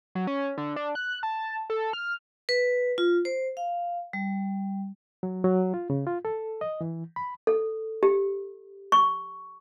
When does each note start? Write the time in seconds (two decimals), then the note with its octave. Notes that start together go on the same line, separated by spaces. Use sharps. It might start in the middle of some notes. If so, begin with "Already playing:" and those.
0.15 F#3
0.27 C#4
0.58 D3
0.76 D4
0.95 F#6
1.23 A5
1.70 A4
1.93 F6
2.49 B4
2.98 F4
3.25 C5
3.57 F5
4.13 G3
5.23 F#3
5.44 F#3
5.74 F4
5.90 C#3
6.07 F4
6.25 A4
6.61 D#5
6.81 E3
7.16 B5
7.47 A4
8.03 G4
8.92 C#6